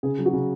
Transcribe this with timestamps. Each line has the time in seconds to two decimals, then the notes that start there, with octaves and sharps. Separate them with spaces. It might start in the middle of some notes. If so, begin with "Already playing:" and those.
0.03 C#3 G#4
0.19 F#3
0.26 F#4
0.33 C#3